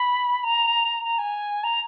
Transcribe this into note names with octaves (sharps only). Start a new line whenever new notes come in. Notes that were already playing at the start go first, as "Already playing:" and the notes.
Already playing: B5
A#5
A#5
G#5
A#5